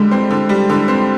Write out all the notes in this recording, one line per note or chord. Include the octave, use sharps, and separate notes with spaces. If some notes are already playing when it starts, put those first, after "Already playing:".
Already playing: D3 G3 G#3
C4
D3
G3
D3
C4